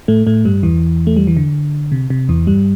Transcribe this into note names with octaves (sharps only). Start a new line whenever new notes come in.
A2 A3
A2 A3
G2 G3
E2 E3
A3
G3
E3
D3
C3
C3
E2 E3
G2 G3